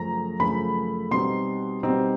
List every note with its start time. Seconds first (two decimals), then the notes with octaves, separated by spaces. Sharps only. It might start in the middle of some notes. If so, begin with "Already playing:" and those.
Already playing: F#2 C#3 F3 A3 A#5
0.39 F#2 C#3 F3 A3 B5
1.11 B2 G3 C4 D#4 C6
1.83 B2 G3 C4 D#4